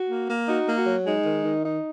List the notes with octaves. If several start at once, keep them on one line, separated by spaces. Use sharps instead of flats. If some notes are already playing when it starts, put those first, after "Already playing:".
Already playing: F#4
A#3
A#3
D#4 F#4
A#3
F#4
F#3
G#3 D#4
D#3
D#3
D#4